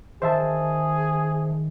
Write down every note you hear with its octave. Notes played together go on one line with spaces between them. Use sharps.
D#3 G#4 C5 E5 A5